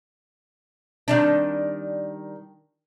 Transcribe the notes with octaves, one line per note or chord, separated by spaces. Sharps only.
D#3 G3 D4